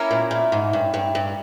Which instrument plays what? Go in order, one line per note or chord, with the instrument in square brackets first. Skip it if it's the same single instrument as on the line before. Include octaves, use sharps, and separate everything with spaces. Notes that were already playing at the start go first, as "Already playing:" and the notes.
Already playing: [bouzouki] A#3 C#4 E4 A#4
[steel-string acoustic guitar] A#2
A#2
G#2
G2
G2
G2